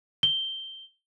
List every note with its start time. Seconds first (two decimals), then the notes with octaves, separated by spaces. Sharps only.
0.23 G7